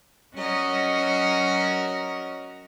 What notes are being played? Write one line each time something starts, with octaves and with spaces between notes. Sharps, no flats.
F#3 C#4 F#4 A#4 D#5